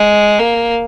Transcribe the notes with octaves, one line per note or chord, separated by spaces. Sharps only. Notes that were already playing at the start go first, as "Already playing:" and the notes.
Already playing: G#3
A#3